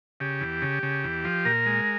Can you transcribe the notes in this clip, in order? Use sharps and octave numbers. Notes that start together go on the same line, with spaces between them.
C#3 G4
E2
C#3
C#3
E2
F3
A#2 A#4
G#3